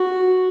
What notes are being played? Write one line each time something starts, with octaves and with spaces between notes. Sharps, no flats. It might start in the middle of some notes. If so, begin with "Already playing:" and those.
Already playing: F#4